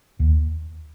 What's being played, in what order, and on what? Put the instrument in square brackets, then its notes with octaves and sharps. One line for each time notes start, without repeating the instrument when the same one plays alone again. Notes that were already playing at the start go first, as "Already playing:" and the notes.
[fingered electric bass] D#2